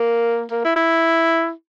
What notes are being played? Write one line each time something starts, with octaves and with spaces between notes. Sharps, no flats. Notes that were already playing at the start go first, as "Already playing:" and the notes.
Already playing: A#3
A#3
E4
E4